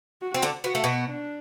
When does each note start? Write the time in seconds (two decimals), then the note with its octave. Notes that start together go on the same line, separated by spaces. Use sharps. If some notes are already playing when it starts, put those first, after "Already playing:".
0.22 F#4
0.34 C4
0.42 D3 D4
0.64 B3 F#4
0.75 A3
0.84 B2 B3
1.06 D4